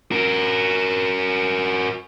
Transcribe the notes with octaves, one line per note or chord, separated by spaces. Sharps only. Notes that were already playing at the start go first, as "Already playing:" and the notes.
F#4 A#4